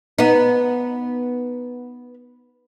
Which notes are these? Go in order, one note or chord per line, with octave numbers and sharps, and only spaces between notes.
B3 D#4